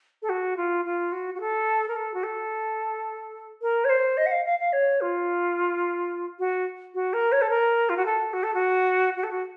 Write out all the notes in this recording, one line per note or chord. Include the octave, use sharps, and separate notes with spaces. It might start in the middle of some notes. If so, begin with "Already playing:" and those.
A4
F#4
F4
F4
F#4
F#4
A4
A#4
A4
F#4
A4
A#4
C#5
C5
D#5
F#5
F5
F5
F5
C#5
F4
F#4
F#4
A#4
C#5
A4
A#4
F4
F#4
A4
F#4
A4
F#4
F#4
A4
F#4